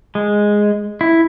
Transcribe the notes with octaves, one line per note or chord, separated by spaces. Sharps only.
G#3
E4